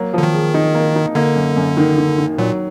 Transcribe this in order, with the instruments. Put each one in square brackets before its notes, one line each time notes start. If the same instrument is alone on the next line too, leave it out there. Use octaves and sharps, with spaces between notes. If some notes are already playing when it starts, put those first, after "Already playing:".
Already playing: [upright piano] F#3 A#3
[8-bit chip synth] D3 [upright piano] F3
[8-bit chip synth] D#3
[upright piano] G#4
D#4
A#3
D#4
[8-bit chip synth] D3 [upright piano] A#3
[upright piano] F#2
F#2
D#3
D#3
D#3
[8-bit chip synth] A#2 [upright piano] F#3